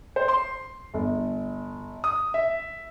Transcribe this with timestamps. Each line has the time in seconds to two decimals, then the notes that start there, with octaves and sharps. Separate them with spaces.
0.16 C5
0.28 C6
0.94 G1
2.04 D#6
2.34 E5